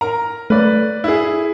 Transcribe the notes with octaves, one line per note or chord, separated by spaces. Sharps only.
A#4 A#5
A3 B4 D5
E4 G#4